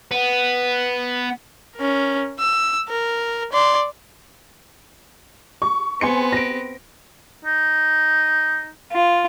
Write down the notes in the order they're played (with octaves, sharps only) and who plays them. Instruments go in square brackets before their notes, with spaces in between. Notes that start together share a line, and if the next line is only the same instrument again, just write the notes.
[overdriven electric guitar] B3
[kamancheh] C#4 A#4
E6
A#4
D5 C6
[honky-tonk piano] C#6
[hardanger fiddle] B3 C4 [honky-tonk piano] G#5 C6 C#7
[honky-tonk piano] A#6 D7
[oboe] D#4
[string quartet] F4